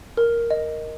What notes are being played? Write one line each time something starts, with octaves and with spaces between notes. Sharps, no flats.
A#4
D#5